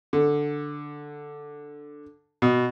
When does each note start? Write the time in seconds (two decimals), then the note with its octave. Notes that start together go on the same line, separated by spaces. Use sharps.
0.13 D3
2.42 B2